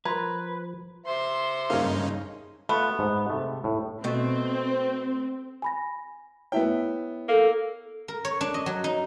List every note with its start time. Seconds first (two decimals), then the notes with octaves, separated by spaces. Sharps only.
0.05 F3 A#4 B4 A#5 C6 G#6
1.06 C5 E5 C6
1.70 G2 C#3 A#3 C#4 D#4 F5
2.69 A3 B3 F4
2.99 G#2
3.30 C3 A3
3.64 A2
4.04 B2 A3 C4
5.62 G#5 B5 A#6
6.52 B3 E4 C#5 E5 G5
7.29 A#3 A4
8.08 A#4
8.25 C#5
8.41 D4
8.54 D#5
8.66 F#3
8.84 D#4